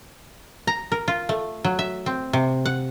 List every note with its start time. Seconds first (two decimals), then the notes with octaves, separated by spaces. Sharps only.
0.67 A#5
0.92 A#4
1.08 F4
1.29 A3
1.65 F#3
1.79 E5
2.06 C4
2.33 C3
2.65 F#5